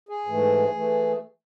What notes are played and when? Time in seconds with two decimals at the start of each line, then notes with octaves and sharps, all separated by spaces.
0.09 G#4
0.26 G#2 E3 A3
0.75 E3 A3